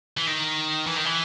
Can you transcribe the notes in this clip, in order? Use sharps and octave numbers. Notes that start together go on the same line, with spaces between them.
E3
D#3
E3
D#3
E3